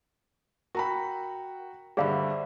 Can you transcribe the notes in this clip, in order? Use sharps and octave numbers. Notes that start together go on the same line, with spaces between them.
F#4 A#4 F#5 G5 A#5 B5
G2 D3 G#4 C5 D5 E5 F5 B5